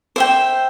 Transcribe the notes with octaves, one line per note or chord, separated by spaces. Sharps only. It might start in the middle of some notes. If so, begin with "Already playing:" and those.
C5 E5 G5